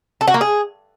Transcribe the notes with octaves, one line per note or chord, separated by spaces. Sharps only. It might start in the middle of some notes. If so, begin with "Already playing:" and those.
A4
F#4
A#3
G#4